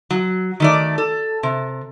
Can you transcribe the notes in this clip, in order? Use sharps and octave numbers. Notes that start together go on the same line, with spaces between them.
F#3
D#3 A3 D5
A4
C3